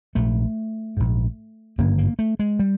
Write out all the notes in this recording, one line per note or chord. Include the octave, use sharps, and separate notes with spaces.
A#1 G#2 A3
A#1 G#2
G#1 G2 D3 A#3
A#3
A3
G#3
G3